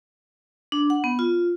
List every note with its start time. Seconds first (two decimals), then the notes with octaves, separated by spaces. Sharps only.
0.72 D4
0.90 F#5
1.04 B3
1.19 F4